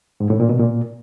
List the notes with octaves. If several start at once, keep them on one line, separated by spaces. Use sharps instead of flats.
G#2
A2
A#2
B2
A#2